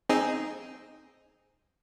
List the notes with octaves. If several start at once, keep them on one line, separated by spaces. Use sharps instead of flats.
C4 D#4 G#4